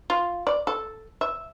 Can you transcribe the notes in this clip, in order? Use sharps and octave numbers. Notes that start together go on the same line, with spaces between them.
F4
D5
A4
E5